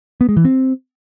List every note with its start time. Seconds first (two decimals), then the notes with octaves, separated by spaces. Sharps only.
0.21 B3
0.29 G#3
0.37 E3
0.45 C4